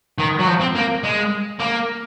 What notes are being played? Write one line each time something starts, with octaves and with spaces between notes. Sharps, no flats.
D#3
F#3
F3
C4
A#3
G#3
A#3